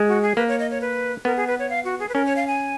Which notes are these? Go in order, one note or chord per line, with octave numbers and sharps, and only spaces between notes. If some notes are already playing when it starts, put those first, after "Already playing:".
Already playing: G#3
F#4
G#4
A#3 B4
C#5
D#5
C#5
B4
B3 A#4
G#4
B4
C#5
F5
F#4
G#4
B4
C#4 A#4
C#5
F5
G#5